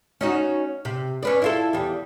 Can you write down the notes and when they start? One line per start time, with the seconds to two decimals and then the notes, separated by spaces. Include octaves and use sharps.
0.21 C#4 D#4 F#4
0.85 C3
1.23 C#4 B4 D5
1.42 E4 F4 A4
1.73 E2 G3